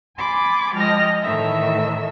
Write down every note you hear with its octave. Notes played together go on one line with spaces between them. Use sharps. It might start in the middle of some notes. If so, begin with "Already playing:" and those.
G#5 B5 C6 D6 A6
F3 G#3 D#5 G5 F6 A#6
A2 D#3 E3 A3 E5 E6